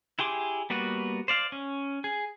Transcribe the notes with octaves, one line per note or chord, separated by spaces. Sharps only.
E4 G4 G#4 C6 D6
G3 A#3 B3 F#4 B4
C5 D5 F5
C#4
G#4